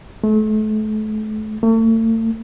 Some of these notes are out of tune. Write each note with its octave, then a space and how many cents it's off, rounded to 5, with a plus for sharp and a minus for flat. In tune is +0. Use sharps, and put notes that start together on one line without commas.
A3 -35
A3 +40